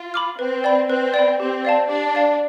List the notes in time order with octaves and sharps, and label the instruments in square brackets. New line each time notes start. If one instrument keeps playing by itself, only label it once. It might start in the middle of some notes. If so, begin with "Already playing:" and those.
Already playing: [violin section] F4
[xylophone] B5 D6 F6
[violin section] C4 [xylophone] B4
[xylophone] D5 G5 B5
[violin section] C4 [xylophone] B4
[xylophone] D5 G5 B5
[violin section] C4 [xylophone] G4
[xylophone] D5 F5 A5
[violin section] D4 [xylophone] G4
[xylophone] D5 F5 A5